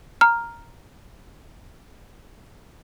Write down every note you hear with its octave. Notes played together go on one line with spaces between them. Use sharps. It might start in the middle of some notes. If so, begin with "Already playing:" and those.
A#5 F6